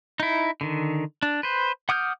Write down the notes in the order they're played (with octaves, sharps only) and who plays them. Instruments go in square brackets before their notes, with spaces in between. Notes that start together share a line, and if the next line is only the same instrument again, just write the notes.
[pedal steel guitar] D#4 E4
D3 D#3
D4
B4 C5
F#5 D6 D#6 F6 G6